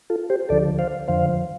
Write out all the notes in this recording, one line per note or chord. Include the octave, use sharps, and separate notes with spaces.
F4 A4
G4 C5
D2 D3 F3 A4 D5
C5 F5
F2 D3 F3 C5 F5